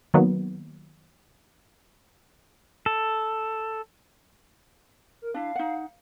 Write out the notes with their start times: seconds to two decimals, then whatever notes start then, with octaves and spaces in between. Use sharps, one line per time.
0.14 D#3 F#3 A#3 B3
2.86 A4
5.22 A#4
5.34 D4 E4 F5
5.55 D#4 F#5